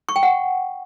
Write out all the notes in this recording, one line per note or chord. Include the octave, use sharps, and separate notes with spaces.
C#6
G5
F#5